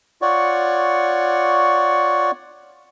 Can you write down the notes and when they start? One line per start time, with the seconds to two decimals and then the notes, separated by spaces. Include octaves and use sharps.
0.22 F4 C#5 D5 F#5 C#6